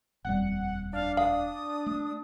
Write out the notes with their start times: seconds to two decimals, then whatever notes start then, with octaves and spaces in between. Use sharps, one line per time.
0.25 D#1 F2 G3 F#5
0.93 D4 F5
1.17 F5 D#6
1.86 A3